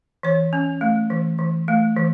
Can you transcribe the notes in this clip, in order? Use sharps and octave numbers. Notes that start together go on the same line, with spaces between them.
E3 C#5
C#4
A3
E3
E3
A3
E3